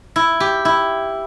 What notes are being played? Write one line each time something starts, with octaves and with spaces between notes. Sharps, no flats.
E4
G4
E4